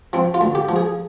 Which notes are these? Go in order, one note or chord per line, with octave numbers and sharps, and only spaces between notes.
F3 C4
F4
D2
G4
F3
G#4